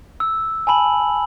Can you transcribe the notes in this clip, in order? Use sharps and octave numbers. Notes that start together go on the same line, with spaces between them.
E6
G#5 A5 B5 F#7